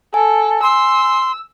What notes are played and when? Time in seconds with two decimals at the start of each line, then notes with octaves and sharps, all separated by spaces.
0.14 A4 G#5
0.63 C6 E6